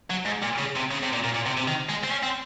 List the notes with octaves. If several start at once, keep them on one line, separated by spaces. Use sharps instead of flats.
F#3
G#2
A#2
C#3
C3
C#3
C3
A#2
A#2
A#2
C3
C3
D#3
G#3
C4
C#4
C4